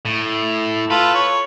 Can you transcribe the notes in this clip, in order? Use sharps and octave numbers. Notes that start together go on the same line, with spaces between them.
A2
F4 A4 B4
C#5